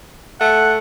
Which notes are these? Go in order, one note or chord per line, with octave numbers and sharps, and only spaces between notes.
A3 F#5